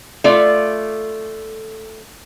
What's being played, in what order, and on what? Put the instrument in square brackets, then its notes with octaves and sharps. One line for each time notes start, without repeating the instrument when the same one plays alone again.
[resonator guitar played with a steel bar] A3 F4 D5